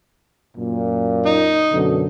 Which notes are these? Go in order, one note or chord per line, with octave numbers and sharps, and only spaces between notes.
F#2 A#2
D#4
F#2 B2 D3